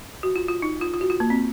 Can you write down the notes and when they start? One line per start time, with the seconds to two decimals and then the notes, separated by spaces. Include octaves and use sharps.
0.23 F#4
0.36 F4
0.48 F4
0.62 D#4
0.81 F4
0.94 F4
1.01 F#4
1.10 F4
1.20 A#3
1.30 C4